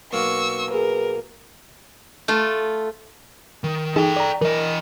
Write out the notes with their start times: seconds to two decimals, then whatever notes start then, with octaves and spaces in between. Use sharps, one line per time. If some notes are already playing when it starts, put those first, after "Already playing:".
0.13 B1 A#3 C#6 E6
0.71 G#4 A#4 B4
2.28 A3 F4
3.64 D#3
3.96 E3 D#4 G#4 A4 G5
4.16 D5 A#5
4.41 E3 A#4 D#5